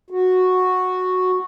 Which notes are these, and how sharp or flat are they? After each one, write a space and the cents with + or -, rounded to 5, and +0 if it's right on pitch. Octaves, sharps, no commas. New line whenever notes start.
F#4 -5